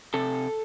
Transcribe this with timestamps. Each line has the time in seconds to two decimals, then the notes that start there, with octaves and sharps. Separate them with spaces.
0.14 C3 A4